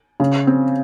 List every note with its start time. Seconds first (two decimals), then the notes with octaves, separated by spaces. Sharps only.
0.20 C#3
0.47 C4